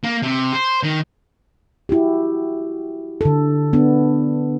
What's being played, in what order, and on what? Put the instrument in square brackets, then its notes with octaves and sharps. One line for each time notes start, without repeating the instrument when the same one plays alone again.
[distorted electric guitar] A#3
C3
C5
D#3
[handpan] E4 F#4 G4
D3 A4
B3 D4